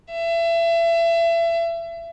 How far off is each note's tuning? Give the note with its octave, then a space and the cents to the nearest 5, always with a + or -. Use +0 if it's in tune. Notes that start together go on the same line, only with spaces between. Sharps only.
E5 +30